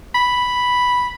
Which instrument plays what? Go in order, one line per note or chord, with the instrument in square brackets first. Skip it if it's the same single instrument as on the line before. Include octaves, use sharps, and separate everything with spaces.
[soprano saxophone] B5